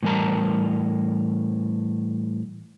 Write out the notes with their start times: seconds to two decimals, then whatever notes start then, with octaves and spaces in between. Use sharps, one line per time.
0.03 A2 E3 G3 A#4 A5 A#5